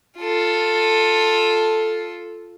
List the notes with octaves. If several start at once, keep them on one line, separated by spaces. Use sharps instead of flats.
F4 A4